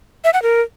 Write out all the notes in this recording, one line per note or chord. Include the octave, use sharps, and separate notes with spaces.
E5
F#5
A#4